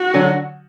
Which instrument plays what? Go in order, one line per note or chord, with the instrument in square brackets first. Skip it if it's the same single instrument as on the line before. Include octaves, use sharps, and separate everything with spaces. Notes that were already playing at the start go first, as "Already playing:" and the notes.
Already playing: [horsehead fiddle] F#4
[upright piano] D3 F#3